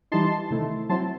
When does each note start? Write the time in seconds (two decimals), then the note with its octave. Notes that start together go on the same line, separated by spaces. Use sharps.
0.12 E3 G3 D#4 A5 C6
0.51 C3 D#3 A3 E4
0.89 F#3 C4 E4 A5 C6